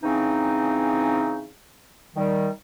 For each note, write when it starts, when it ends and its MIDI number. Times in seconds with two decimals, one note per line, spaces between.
0.03 1.46 49
0.03 1.46 52
0.03 1.46 60
0.03 1.46 61
0.03 1.46 63
2.16 2.48 51
2.16 2.48 55